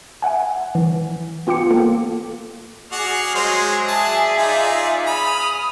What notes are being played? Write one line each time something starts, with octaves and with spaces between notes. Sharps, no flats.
E5 F#5 G#5
E3
B3 F4 G5 D6 C#7
A#3 A4
F#4 G#4 D5 F#5 F6 C7
F#3 G#3 C5
D5 E5 A5
D#4 F4
B5 D#6 F6